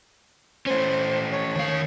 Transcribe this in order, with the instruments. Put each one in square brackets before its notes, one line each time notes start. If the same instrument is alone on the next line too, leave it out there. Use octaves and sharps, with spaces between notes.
[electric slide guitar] A3 C#4 [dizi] C5
[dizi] C#5
[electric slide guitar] D#3 F5